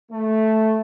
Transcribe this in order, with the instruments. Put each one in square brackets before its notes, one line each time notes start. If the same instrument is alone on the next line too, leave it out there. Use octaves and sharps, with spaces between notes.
[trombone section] A3